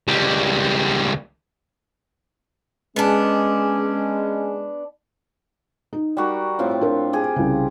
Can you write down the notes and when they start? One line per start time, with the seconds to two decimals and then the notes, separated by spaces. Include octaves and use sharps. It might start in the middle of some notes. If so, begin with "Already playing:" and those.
0.08 C#2 G3
2.96 G#3 B3 C#4 D4
5.93 D#4
6.17 G3 F#4 A#4
6.59 A2 C4 F4
6.81 D4 A#4
7.13 G4 G#4
7.36 C2 C#3